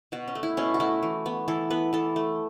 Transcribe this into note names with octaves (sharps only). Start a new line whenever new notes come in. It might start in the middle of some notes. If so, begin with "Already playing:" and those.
B2 F#4
C#4
A3
E4
B2 C#4
F#4
A3 E4
E3
B3
E3 A4
B3 B4
E3 A4
A3